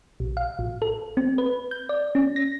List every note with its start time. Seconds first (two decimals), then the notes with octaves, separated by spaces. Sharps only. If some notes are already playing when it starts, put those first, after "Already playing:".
0.20 A#1
0.37 F5
0.59 A1
0.82 A4
1.17 C4
1.38 B4
1.71 G6
1.89 D5
2.15 C#4
2.36 A#6